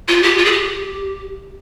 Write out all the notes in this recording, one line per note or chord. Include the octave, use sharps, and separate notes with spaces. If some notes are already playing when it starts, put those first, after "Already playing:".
F4
G4
F4
G#4
G4